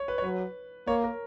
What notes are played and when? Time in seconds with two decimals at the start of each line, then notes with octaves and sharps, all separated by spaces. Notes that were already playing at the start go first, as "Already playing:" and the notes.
Already playing: C#5
0.08 B4
0.18 C#5
0.23 F#3 B4
0.87 A#3 C#5
1.04 A#4